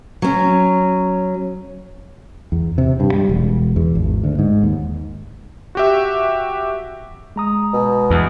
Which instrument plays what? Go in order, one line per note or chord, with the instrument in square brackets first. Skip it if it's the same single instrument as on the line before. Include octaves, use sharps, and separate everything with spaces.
[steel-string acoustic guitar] F#3 C#4
[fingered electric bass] E2
C3
G2
G3
E1
E2
G#1
D2
G#2
D#2
[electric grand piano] F#4 G4 E5
[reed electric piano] G#3 A#5 D#6
[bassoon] B2
[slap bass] E2